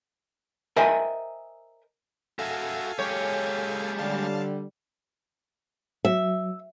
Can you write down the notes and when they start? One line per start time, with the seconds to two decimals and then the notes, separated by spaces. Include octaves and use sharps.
0.76 A#4 C5 D#5 E5 G5 G#5
2.39 F#4 A4 E5 F5 G#5
2.99 G#3 C#4 G4 C#5
3.98 D3 G3 F5 A5
6.05 F#3 E5